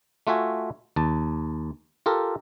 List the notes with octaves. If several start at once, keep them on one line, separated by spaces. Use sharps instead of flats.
A3 F4 F#4 E5 G#5
D#2 A5
F4 G4 A4 A#4